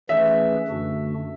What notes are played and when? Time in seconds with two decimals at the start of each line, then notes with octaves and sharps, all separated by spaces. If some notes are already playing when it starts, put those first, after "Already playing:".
0.09 E3 A3 C#4 G#4 B4 E5
0.67 F#2 D3 A3 D4 F#4